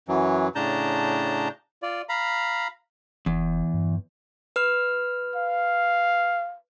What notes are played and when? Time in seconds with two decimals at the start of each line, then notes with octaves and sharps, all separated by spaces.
0.08 F#2 E3 F#3
0.55 A2 C#3 D4 A5 A#5 G6
1.82 F4 D5
2.09 F5 A#5 B5
3.26 F1 E2
3.74 G2
4.56 B4 F6
5.35 F5